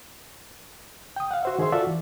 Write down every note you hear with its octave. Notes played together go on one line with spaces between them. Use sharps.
G5 D#6
F5 F#5
F#4 C5 E5
D#3 G#4 C5 E5 C6
F4 F#4 A4 D5 E5
E3